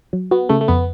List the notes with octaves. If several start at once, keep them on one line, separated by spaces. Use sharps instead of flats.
F#3
B3 F#4
C#3 A3
A3
F2 B3